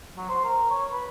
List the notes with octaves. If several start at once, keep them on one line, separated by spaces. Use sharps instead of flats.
F#3
C5
A#4
C#5
B4